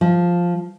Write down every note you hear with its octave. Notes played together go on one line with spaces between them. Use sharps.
F3